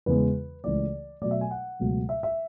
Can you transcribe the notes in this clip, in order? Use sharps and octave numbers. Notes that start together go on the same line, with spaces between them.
E2 C#3 E3 G#3 B3 B4
C#2 C#3 E3 A3 D5
B2 F#3 A3 D5
E5
G#5
F#5
C#2 B2 F#3 A3
E5
E5